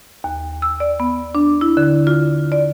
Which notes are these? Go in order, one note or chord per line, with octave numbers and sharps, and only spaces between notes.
D#2
E6
D5
B3
D4
E4
D3
F4
D5